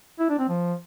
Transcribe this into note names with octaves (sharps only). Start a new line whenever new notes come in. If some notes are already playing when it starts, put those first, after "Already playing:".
E4
D4
C4
F3